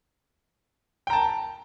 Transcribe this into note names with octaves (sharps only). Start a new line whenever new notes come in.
G5 A5 A#5